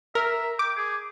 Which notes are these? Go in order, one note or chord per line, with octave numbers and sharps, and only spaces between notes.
A#4 E5
G5 D6
G#4